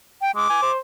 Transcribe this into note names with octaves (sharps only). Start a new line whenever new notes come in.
G5
G#3 D6
G#5
C5